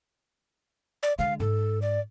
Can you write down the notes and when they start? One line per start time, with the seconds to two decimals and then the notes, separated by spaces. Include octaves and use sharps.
1.03 D5
1.19 D3 G#3 F5
1.40 G#2 A4
1.82 D5